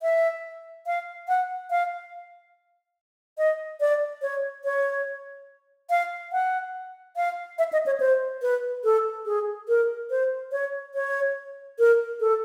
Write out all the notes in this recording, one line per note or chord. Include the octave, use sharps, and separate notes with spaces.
E5
F5
F#5
F5
D#5
D5
C#5
C#5
F5
F#5
F5
E5
D#5
C#5
C5
B4
A4
G#4
A#4
C5
C#5
C#5
A#4
A4